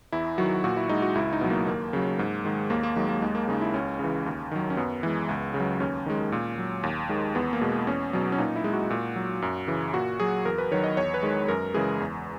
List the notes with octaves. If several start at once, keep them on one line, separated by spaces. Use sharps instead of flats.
E2 E4
D#3 F#3 F#4
A#2 F#4
E4
G#3 D#4
F#4
C#2 E4
D#4
B2 F#3
A#3
D#2 A#3
C#3 F#3
G#2
D#3 G#3
D#2 A#3
A#3
D#3 F#3 G#3
A#3
D#2 G#3
A#3
C#3 G#3 D#4
E4
C#2 C#4
C#3 E3
D#2
D#3 F#3
C#4
F#2 B3
E3 G#3
C#2
C#3
F#3
D#2 C#4
D#3 G#3
A#2
F#3
D#2
D#3 G#3
E2 B3
A#3
B2 G#3
E2 C#4
B2 F#3
C#4
A#2 D#4
E4
G#3
F#4
A#2
F#3
F#2
C#3 E3
A#2 F#4
F#3 G#4
E2 A#4
B4
D#3 F#3 C#5
D#5
E2 C#5
B4
D#3 G#3
F#2 A#4
C#3 E3 G#3 G#4
E2